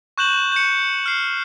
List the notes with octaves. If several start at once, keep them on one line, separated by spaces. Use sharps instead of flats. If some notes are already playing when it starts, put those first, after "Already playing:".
C#6 F#6 G6 E7 F#7
G6 C#7
F6 C7